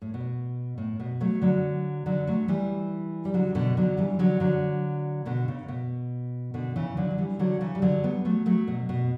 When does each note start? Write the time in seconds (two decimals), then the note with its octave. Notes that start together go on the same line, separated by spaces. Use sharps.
0.02 A2
0.14 B2
0.78 A2
1.00 B2
1.21 F#3 A3
1.42 D3 F#3
2.06 D3 F#3
2.27 F#3 A3
2.48 E3 G3
3.25 G3
3.34 D3 F#3
3.55 B2 D3
3.77 D3 F#3
3.97 E3 G3
4.19 D3 F#3
4.40 D3 F#3
5.25 B2 D3
5.48 C#3
5.68 B2
6.54 B2 D3
6.76 C#3 E3
6.97 D3 F#3
7.11 F#3
7.18 E3 G3
7.39 D3 F#3
7.61 C#3 E3
7.75 G3
7.82 D3 F#3
8.04 G3 B3
8.25 F#3 A3
8.46 F#3 A3
8.67 B2
8.89 B2